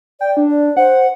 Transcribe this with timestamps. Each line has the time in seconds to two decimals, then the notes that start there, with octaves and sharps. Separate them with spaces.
0.21 D5 G5
0.37 D4
0.51 D5
0.77 C5 F#5